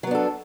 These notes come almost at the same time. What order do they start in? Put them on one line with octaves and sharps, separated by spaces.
F#3 B3 D4 A4